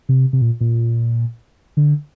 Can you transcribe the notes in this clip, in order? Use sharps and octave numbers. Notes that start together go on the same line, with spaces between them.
C3
C3
A#2
A#2
D3